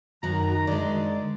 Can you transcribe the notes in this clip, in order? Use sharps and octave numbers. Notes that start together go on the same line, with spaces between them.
F#2 D#3 F#3 F#4 A#5
A#5
D3 G#3 D5